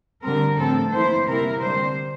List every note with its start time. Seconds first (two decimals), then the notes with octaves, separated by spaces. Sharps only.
0.23 D3 G3 C4 A#4
0.57 A2 F3 C4 A4
0.93 E3 A#3 E4 C5
1.27 C3 G3 A#3 E4 A#4
1.62 D3 G3 C4 C5